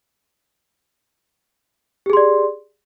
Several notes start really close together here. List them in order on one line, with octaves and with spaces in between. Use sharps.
G4 G#4 C6 D5